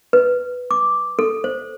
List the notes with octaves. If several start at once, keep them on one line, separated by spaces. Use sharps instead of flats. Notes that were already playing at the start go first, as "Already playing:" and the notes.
B4
D6
A4
C5